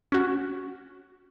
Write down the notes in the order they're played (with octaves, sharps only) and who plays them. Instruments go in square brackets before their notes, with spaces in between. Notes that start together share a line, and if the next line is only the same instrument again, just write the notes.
[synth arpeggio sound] C#4 F#4